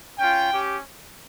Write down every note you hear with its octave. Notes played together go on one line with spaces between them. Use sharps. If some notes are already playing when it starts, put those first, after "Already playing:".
C#4 F4 G5
C#4 G4